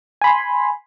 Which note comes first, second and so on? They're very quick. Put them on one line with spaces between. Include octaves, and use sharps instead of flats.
G#5 B5 C6